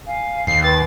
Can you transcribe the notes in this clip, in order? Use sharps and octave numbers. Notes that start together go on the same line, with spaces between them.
F5 G#5
D#2 C7
B4 G5 A6